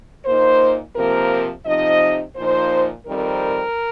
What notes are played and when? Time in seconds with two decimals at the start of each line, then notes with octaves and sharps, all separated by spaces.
0.25 A#2 A#3 D#4 C5
0.94 C3 F3 A#3 A#4
1.65 C3 F3 D#4 D#5
2.35 A#2 F3 D#4 C5
3.06 F2 D#3 G3 C4 A#4